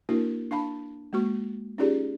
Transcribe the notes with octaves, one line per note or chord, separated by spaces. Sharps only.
A#3 D4 E4 F#4 A#4
D4 F5 A5 B5
G#3 A#3 F#4 C#6
C#4 D#4 F4 G4 G#4 D5